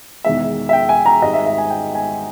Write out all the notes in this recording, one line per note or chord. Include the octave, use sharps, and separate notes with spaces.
E1 E2 D#3 E5
E5
G5
G#5
A#5
G#1 G#2 G3 D#5
E5
E5
G#5
G5
G#5